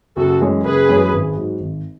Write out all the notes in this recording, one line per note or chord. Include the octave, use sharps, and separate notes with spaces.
F#1 F#4 A4
F#2 E3 G#3 C#4
F#1 G#4 B4
F#2 E3 G#3 C#4
G#1
G#2 F#3
G#1